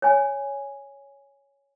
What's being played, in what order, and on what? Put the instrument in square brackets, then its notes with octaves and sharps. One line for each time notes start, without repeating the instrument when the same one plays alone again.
[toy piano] C#5 G#5